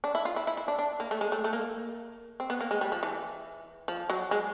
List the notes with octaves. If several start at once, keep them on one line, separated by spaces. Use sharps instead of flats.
D4
E4
F4
E4
E4
E4
D4
D4
A#3
A3
G#3
A3
A3
A#3
C4
B3
A#3
G#3
G3
F3
E3
F3
F#3
G#3